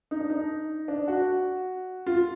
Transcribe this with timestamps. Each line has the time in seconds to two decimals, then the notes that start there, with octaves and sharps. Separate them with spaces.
0.11 D#4
0.20 D4
0.30 D#4
0.88 D4
1.08 F#4
2.07 F4